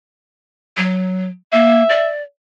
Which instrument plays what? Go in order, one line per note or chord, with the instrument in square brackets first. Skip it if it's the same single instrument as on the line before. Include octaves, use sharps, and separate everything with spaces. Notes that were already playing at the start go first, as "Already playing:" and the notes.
[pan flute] F#3
[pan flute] A#3 [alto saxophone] E5
[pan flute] D5